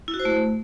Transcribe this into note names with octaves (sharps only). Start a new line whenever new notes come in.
E4
F#4
C5
A3